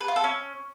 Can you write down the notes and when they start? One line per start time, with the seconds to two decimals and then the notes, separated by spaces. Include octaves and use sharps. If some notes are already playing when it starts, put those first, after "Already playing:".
0.01 B4
0.08 F4
0.16 A4
0.24 C#4